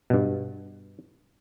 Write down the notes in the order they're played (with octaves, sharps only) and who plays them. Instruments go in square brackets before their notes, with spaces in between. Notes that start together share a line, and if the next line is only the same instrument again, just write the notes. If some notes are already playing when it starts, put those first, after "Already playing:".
[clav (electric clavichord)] G2 B2